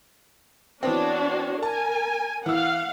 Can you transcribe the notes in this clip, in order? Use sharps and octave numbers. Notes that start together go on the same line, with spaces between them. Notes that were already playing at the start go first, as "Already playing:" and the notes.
E3 B3 C4 D4 F#4 C#5
A#4 G#5 A5
E3 F5 F#5 E6